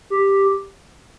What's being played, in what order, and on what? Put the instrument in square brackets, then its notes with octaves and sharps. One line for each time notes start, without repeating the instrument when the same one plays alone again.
[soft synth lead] G4